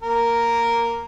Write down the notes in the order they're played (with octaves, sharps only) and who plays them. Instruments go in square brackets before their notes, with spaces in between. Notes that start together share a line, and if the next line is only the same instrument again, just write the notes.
[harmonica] A#3 A#4